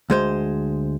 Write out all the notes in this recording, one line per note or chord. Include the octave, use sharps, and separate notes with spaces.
D2 G#3 C5